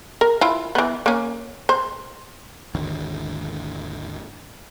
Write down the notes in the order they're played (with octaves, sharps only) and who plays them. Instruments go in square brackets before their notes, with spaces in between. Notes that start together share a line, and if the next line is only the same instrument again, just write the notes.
[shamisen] A#4
E4 F4
E3 B3
A#3 C#4
C5
[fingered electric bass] G#1 D#2 D3